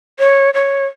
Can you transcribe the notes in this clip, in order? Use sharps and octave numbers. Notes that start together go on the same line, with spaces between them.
C#5
C#5